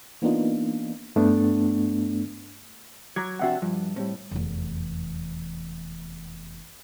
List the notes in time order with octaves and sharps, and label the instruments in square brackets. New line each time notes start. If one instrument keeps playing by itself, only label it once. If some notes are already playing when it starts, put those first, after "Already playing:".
[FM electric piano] E3 A#3 B3 D4 D#4 F4
[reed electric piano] G2 A3 B3 D4
[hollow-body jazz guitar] F#3 [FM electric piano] A#5 D6 G#6
[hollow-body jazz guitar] F2 C3 D4 [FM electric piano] F#4 E5 F#5
[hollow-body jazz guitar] G2 [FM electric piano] F3
[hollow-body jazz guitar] A2 [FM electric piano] G3 C4
[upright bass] F1 E2